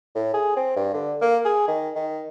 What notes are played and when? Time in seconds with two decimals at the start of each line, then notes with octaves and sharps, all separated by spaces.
0.15 A2
0.34 G#4
0.57 C4
0.76 G2
0.94 D3
1.22 A#3
1.45 G#4
1.68 D#3
1.95 D#3